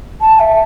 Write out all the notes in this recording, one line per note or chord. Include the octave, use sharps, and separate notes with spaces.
A5
E5